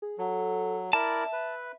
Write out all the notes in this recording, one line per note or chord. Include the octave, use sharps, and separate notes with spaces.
G#4
F#3 A4
E4 A#4 D5 E5 A5
B4